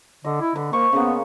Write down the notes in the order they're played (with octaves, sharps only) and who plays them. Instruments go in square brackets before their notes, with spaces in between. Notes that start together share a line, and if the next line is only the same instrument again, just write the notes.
[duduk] D3 [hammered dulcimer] D#5
[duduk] E4
[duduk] D3 [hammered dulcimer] B4
[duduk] A#3 [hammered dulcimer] C5 C#6
[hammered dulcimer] C#3 A#3 [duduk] B3